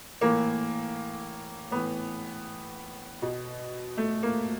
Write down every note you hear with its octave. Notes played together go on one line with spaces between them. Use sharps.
A2 E3 A#3
A2 E3 B3
B2
A3
A#3